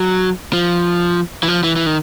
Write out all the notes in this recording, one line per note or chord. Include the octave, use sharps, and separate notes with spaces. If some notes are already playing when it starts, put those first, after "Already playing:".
Already playing: F#3
F3
E3
F3
E3
E3
D#3